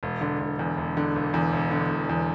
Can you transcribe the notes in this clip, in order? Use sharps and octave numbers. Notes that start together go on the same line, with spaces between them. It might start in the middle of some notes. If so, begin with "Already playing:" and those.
E1
D3
E1
E2
E1
D3
E1
E2
E1
D3
E1
E2